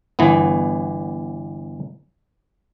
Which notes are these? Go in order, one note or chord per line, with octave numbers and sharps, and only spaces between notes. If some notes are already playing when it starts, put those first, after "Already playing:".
G1 E3 B3